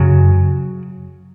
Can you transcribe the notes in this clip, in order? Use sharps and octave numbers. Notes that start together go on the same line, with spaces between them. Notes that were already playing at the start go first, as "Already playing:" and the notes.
Already playing: F#2 C#3 F#3